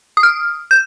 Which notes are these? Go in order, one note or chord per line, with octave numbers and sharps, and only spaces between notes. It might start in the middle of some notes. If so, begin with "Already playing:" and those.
D#6
F6
G6